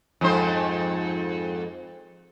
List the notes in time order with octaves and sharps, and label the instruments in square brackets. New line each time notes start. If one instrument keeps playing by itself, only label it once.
[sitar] F2 G#2 C5